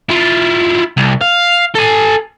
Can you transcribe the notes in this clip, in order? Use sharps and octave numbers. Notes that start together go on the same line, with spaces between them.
E4 F4
C2
F5
A4 G#5